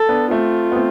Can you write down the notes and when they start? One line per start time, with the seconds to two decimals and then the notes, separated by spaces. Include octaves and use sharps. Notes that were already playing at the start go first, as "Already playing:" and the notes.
Already playing: A4
0.09 B3 D4
0.31 A3 C4 F4
0.72 B3
0.75 A3 C4